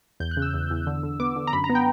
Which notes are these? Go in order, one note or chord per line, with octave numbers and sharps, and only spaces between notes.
E2 G6
F#6
C#3
E6
E2
E2
D3
D3
B3 D6
D3
A#5
F#2 B5
A#5
B3
G5